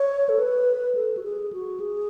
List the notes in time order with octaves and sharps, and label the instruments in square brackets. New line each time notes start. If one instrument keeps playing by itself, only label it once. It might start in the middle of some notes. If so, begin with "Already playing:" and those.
Already playing: [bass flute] C#5
A4
B4
A4
F#4
G#4
F#4
G#4